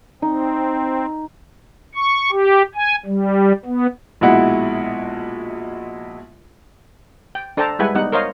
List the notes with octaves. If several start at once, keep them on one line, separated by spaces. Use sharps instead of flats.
C4 D#4
C#6
G4
G#5
G3
B3
A#1 B2 G#3 E4 F#5
G5
D4 A4 C5 G5 A5 A#5
G3 G#3 E4 B4 F#5 G#5
G3 B3 D#4 F#5
A#4 C5 C#5 D#5 F5